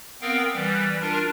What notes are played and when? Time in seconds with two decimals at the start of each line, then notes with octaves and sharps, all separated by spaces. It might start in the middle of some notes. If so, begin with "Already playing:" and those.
0.22 B3 C4 A#4 F5 G5
0.54 E3 G3
1.01 D4 F4 A#4